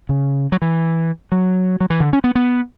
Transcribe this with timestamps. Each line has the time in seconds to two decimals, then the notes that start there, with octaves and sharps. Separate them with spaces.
0.09 C#3
0.52 F#3
0.62 E3
1.32 F#3
1.80 F#3
1.90 E3
2.00 D3
2.13 C#4
2.24 B3
2.35 B3